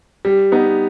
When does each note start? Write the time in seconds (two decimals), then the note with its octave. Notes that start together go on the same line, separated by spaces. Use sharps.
0.25 G3
0.52 B3 D#4